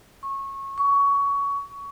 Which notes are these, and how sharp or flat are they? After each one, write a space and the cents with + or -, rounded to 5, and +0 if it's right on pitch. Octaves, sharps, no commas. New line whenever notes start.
C#6 -20
C#6 +20